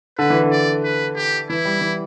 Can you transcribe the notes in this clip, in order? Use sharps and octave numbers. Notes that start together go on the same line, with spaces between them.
D3 B4
E3
D3
D5
B4
G4
E3 E4
G3
E3